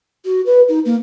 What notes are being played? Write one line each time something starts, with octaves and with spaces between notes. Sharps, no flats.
F#4
B4
D#4
A#3